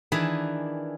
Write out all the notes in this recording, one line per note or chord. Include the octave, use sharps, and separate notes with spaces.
D#3 E3 D4 G#4 B4